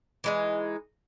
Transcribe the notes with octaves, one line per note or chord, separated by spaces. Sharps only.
E3 G#3 D#4